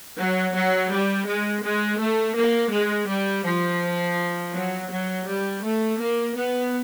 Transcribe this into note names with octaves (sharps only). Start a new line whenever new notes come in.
F#3
F#3
G3
G#3
G#3
A3
A#3
G#3
G3
F3
F#3
F#3
G3
A3
A#3
B3